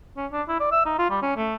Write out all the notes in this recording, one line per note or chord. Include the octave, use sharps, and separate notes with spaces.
C#4
D4
E4
D5
E5
D#4
F4
G3
C#4
A3